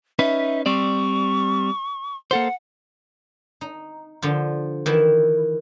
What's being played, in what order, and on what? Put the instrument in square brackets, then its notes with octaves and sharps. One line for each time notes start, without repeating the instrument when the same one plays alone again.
[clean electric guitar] C#4 D#4 B4 [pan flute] E5
[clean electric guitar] G3 C4 D5 [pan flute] C#6
[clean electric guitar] A#3 A4 C5 [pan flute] F#5
[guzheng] D#4
D3 F3 F4
D#3 E3 E4